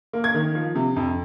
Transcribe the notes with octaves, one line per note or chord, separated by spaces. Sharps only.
A#3
G#6
D#3
F3
C3
F2